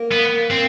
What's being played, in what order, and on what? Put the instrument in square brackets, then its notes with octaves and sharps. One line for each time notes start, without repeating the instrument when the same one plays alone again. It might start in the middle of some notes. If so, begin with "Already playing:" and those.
Already playing: [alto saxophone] A#3
[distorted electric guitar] B3
C4